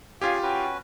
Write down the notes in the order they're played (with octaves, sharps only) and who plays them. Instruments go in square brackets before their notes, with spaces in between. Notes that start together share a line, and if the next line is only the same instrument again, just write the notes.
[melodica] C#4 G#4 G#5 [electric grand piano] F4 G4 [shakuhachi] F5
[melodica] C#4 F#4 B4 [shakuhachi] G5